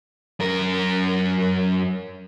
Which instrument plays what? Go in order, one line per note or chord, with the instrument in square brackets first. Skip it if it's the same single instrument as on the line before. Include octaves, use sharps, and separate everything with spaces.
[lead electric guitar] F#2 A#4